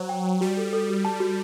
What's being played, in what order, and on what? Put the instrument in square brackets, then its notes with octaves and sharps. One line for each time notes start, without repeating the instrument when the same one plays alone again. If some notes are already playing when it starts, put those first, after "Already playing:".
Already playing: [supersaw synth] F#3 [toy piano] C5
[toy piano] G5
G5
[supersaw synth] G3 [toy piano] F#4
[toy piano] A4
A4
F#4
A5
F#4